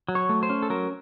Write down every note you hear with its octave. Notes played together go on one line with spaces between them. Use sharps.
F#3
C#5
A3
C5
C#4
A4
F#3 A#4